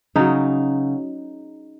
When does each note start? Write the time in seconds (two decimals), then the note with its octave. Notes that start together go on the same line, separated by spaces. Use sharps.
0.16 C#3 F#3 D#4